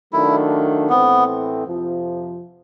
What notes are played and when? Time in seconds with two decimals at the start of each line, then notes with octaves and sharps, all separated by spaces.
0.13 D#3 F#3 A3 D4 E4 F4
0.90 A2 E3 A3 B3 C4
1.66 F2 C3 F3